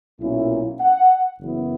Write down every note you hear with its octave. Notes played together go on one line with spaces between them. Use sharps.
B1 A#2 A#3 C#4 E4
F#5
F#1 F#2 E3 B3 E4